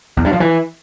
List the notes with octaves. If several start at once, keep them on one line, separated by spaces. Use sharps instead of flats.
E2
G2
F3
E3